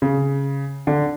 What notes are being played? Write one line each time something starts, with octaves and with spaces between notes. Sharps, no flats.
C#3
D3